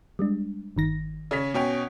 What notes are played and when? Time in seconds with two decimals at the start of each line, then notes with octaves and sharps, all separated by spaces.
0.19 G3 G#3 D4
0.76 G1 D#3 A#6
1.31 C#3 C#4 B6
1.54 B2 C#4 G5